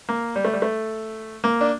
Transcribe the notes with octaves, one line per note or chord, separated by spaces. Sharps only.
A#3
G3
A3
G3
A3
A#3
D4